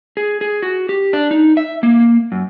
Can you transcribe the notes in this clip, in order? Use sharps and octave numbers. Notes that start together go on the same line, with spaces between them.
G#4
G#4
F#4
G4
D4
D#4
E5
A#3
F#2